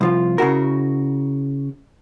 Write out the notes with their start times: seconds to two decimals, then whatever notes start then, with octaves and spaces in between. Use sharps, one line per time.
0.01 C2 F3 F4
0.38 C#3 E4 F#4 A#4